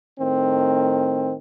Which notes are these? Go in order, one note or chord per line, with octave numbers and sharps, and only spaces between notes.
A2 D#3 C4